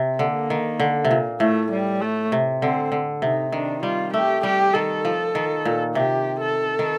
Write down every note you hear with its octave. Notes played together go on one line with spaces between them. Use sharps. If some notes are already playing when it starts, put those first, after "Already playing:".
Already playing: C3
D3 A#3
D#3
D3
C3
A#2
A2 A3
G3
A3
C3
D3 C4
D3
C3 D#4
D#3 D4
G3 F4
A3 G4
G3 G4
D#3 A4
F3
D#3
A#2
C3 G4
A4
D#3